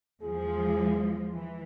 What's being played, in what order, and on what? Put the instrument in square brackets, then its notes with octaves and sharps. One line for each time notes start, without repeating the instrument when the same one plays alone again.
[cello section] E2 F3 G#3 [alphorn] G#4
[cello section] E3